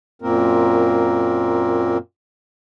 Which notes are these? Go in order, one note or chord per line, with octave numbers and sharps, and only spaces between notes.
F#2 A#2 A#3 C4 A#4